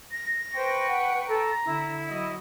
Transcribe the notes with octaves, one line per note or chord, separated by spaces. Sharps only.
A#6
B4 C5 G5 C#6
F#5
A4 A#5
D3 E4
F#3 D#5